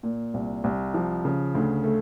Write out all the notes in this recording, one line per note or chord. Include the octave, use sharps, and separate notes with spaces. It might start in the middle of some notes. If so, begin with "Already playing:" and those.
A#2
C2
C2
F3
C#3
D2
A3